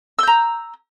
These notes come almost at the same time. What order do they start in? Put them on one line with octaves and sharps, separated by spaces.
E6 G6 A#5